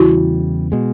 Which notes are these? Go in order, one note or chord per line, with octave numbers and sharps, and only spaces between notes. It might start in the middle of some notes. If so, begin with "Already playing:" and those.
Already playing: E2 C#3 E3 G3 E4 F#4
B2 G#3